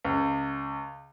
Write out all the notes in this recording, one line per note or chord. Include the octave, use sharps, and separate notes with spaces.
C#2